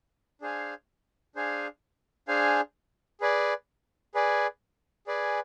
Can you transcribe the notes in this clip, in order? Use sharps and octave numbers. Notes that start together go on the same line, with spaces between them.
D4 G#4 C5 F5 G#5
D4 G#4 C5 F5 G#5
D4 G#4 C5 F5 G#5
G#4 B4 D5 G#5
G#4 B4 D5 G#5
G#4 B4 D5 G#5